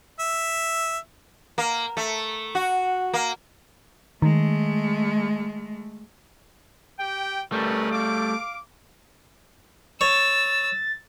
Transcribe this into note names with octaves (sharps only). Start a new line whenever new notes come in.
E5
A#3
A3
F#4
A#3
D#3 G#3 A3
G4 G5
G3 A3 C#4 A#4 B4
F5 D6
C#5 E6 A6